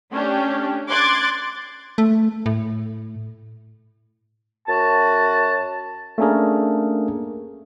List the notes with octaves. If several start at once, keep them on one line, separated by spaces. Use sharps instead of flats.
A3 C#4 D4 G4
C6 D6 F#6 G#6 A6
A3
A2
F#2 F#4 A5
A3 A#3 C#4 D4 G#4 A#4